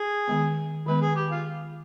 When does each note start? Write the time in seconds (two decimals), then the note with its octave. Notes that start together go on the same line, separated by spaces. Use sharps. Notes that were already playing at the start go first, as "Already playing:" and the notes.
Already playing: G#4
0.28 D#3 G#3 B3
0.86 D#3 G#3 B3 B4
1.01 G#4
1.15 G4
1.31 F4